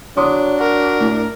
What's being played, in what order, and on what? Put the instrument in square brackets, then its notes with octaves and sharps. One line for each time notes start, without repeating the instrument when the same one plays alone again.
[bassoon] F#3 [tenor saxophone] D4 [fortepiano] C6 D6 D#6
[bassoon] F#4 [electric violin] A#4
[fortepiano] A2